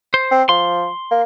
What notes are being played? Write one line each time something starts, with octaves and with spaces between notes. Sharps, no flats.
C5
C4
F3 C6
A#3